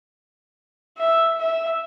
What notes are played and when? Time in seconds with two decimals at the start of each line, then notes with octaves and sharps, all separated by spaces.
0.98 E5
1.39 E5